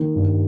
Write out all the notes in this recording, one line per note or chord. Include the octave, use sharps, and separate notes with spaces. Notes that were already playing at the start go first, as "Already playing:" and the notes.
Already playing: D#3 A#3
G2